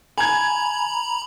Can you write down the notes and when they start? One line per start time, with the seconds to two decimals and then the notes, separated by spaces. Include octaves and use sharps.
0.18 G#5 A#5 B5 G#6